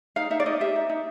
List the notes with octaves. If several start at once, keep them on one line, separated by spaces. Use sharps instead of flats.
D#4 F5
D#4 E5
D5
D#4 D#5
G4 E5
D#4
D#4